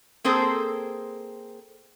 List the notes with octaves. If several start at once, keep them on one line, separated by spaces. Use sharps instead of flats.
A#3 C4 G#4 A4 C5